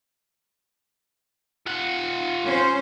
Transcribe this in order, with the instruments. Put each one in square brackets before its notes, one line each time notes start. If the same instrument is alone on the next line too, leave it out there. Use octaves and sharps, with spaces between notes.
[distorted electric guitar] F4 F#5
[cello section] C#4 C5